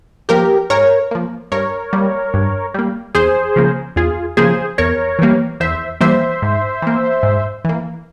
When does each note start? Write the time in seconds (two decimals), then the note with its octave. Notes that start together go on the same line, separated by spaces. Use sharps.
0.29 F3 A#3 G4 A#4
0.70 G#2 A#4 C#5
1.11 F3 A#3
1.52 G2 A#4 C#5
1.93 G3 A#3
2.34 G2
2.74 G3 A#3
3.15 E2 G#4 C5
3.56 C#3 F3 A#3
3.96 E2 F4 G#4
4.37 C#3 F3 A#3 G#4 C5
4.78 E2 A#4 C#5
5.19 E3 G3 A#3
5.60 E2 C5 E5
6.01 E3 G3 A#3 C5 E5
6.42 G#2
6.82 E3 A#3
7.23 G#2
7.65 E3 A#3